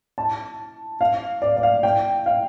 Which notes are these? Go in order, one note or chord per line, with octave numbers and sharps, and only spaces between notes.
A5
F5
D5
D5
F5
G5
F5